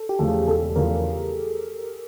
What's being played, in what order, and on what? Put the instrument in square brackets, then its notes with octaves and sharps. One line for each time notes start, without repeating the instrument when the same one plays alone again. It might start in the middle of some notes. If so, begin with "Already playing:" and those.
Already playing: [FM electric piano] A4
G4
[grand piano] E2 C#3 F3 A3
[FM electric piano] G#4
[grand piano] E1 [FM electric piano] A4
[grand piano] E2 C#3 F3 A3 [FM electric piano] A#4